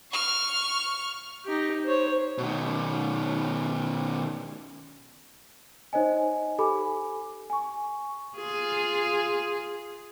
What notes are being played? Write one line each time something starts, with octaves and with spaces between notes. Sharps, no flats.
C#6 F6
D#4 G4
C5 C#5
B2 D#3
D#4 C5 C#5 D#5 G#5
G4 A4 G#5 B5 D6
G#5 C#6
F4 G#4